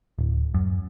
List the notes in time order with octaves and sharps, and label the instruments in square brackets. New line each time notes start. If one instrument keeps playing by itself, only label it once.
[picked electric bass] D1
F#2